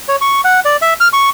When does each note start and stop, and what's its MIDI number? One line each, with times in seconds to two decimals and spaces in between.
0.08 0.16 73
0.21 0.41 85
0.44 0.60 78
0.65 0.77 74
0.82 0.94 76
1.00 1.08 89
1.13 1.30 85